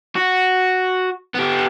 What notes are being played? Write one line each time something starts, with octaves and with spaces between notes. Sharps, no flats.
F#4
B3 G4